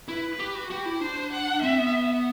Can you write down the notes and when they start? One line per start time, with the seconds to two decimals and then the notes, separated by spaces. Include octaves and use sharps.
0.08 E4 B4
0.40 G4
0.55 F#4
0.70 F#4 G4
0.86 E4
1.01 D4 C5
1.32 F#5
1.62 C4 E5
1.78 B3